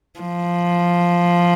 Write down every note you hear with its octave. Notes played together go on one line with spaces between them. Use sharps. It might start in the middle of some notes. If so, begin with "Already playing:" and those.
F3